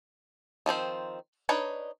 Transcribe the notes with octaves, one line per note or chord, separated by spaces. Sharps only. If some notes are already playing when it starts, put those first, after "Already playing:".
D#3 F3 C4 C5
D4 D#4 B4 C#5